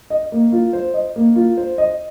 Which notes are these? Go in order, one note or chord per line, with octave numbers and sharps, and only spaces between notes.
D#5
A#3
F4
C5
D#5
A#3
F4
C5
D#5